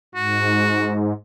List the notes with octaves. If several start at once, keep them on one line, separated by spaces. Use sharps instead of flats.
G#2 F#4